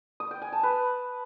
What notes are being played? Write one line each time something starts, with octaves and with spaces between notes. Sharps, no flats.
D#6
G5
G#5
A5
B4